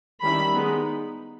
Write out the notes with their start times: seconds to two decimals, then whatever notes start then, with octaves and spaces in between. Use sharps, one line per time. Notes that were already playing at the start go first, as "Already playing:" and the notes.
0.21 D#3 G3 C#4 E4 B5
0.54 G#3 B3 D#4